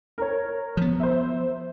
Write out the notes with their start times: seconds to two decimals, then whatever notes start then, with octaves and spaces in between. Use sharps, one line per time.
0.18 A#4 C#5
0.77 F3 B3
1.00 C5 E5